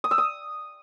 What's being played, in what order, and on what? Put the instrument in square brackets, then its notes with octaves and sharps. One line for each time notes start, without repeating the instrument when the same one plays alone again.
[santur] D#6
E6
D#6